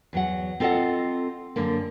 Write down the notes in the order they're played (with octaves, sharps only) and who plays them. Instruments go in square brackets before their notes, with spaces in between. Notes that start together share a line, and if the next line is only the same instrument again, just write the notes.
[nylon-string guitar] E2 F#3 F#5
C4 F4 A4 D5 D#5 F#5
F#2 D3 A#3